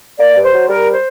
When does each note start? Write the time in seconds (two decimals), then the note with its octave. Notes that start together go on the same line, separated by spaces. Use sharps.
0.18 A#3 D5
0.35 G2
0.44 C5
0.53 F#3
0.68 G3 A#4
0.93 C5